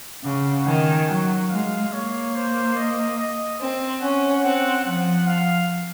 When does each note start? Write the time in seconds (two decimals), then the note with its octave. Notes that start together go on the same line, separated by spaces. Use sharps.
0.25 C#3 F#5
0.67 D#3 G#5
1.09 F#3 F#5
1.50 G#3 F5
1.93 A#3 C#5
2.35 C5
2.77 D#5
3.18 D#5
3.60 C4
4.01 C#4 F#5
4.44 C4 F#5
4.85 F3 F#5
5.27 F5